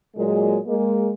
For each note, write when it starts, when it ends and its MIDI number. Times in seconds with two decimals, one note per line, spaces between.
0.16 0.58 46
0.16 0.58 54
0.16 0.58 56
0.66 1.11 56
0.66 1.11 58